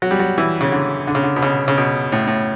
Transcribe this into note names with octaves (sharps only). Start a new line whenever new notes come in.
F#3
G3
F#3
E3
C#3
D3
D3
C#3
D3
B2
C#3
C#3
B2
A2
A2